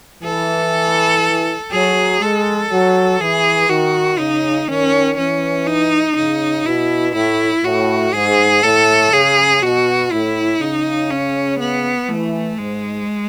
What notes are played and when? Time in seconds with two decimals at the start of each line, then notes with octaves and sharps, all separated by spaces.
0.24 E3 A4
1.72 F#3 G#4
2.21 G#3 A4
2.71 F#3
3.20 E3 G#4
3.69 D#3 F#4
4.19 C#3 D#4
4.68 D#3 C#4
5.18 E3 C#4
5.67 D#4
6.16 C#3 D#4
6.66 B2 E4
7.15 A2 E4
7.65 A2 F#4
8.14 G#2 G#4
8.63 A2 A4
9.12 C#3 G#4
9.62 B2 F#4
10.11 A2 E4
10.61 C#3 D#4
11.11 C#4
11.60 B3
12.09 E3 A3
12.58 G#2 G#3